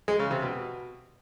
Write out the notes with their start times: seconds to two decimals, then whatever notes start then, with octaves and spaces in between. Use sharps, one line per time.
0.08 G#3
0.19 C#3
0.31 C3
0.42 B2